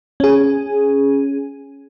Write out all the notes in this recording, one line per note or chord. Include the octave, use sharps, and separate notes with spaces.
C#4 G#4